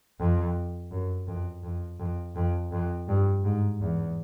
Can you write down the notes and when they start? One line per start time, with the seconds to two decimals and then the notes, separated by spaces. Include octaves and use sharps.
0.20 F2
0.91 F#2
1.27 F2
1.63 F2
1.99 F2
2.36 F2
2.72 F2
3.08 G2
3.44 G#2
3.80 E2